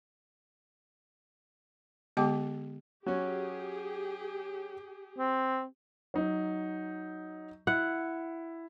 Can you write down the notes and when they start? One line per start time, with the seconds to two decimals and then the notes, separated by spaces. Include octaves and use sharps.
2.17 D3 G#3 B3 G4 G5 D6
3.06 F#3 C#4 G4 G#4
5.18 C4
6.14 F#3 D#4
7.67 E4 F#5